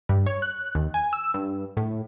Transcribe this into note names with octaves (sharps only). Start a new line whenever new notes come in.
G2
C#5
F#6
D#2
G#5
E6
G2
A2